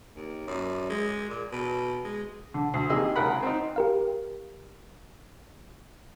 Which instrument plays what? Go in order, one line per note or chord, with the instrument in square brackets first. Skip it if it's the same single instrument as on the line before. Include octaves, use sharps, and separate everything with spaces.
[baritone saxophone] D#2
F#2
G#3
A#2
B2
G#3
[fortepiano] D3
D2
C3 D#3 A#3 G#4 D#5 E6
G#1 C#2 A#4 F#5 B5
C4 D#4
[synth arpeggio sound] G4 A#4 F5